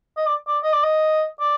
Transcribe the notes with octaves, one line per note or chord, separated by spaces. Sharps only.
D#5
D5
D5
D#5
D5
D#5
D5